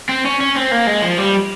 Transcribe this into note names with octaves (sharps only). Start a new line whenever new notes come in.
C4
C#4
C#4
C4
A#3
G#3
F3
G3